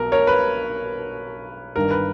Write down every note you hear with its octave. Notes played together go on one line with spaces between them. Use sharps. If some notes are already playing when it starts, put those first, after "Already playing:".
Already playing: B1 B2 A#4
A#4 C#5
B4
G1 G2 D#3 A#4
B4